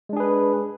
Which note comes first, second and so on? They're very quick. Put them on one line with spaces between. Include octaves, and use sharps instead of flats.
G#3 D4 G#4 B4